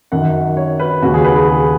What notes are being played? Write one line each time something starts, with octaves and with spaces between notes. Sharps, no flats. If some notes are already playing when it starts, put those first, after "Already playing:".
F#2 D#3 F#5
C#5
B4
D#2 C#3 F#4
G#4
B4
G#4
G#4